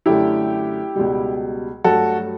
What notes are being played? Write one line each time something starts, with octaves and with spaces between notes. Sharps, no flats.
F#2 D3 A3 E4 G4
C#2 B2 G3
G2 F#3 A3 F#4 A4